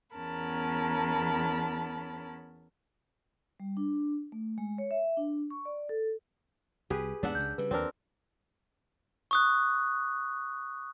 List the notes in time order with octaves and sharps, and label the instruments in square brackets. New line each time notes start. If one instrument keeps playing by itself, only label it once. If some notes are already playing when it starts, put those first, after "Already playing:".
[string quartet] E2 B3 C#4 A#4 A5 B5
[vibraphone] G3
D4
A3
G#3
C#5
E5
D4
C#6
D5
A4
[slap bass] C2 [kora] G4 G#4 B4
[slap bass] E2 G#2 B3 [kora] D4 E5 F#5
[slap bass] C#2 C#3 [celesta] G6
[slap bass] C#3 G3 [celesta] B4
[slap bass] D#2 [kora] C4 D4 A#4
[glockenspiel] C#6 D#6 F#6